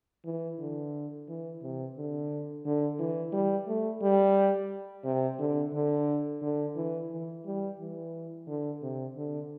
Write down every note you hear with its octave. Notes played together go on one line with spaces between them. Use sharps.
E3
D3
E3
C3
D3
D3
E3
G3
A3
G3
C3
D3
D3
D3
E3
E3
G3
E3
D3
C3
D3